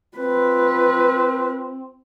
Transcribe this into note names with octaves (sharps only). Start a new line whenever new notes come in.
C4 F4 B4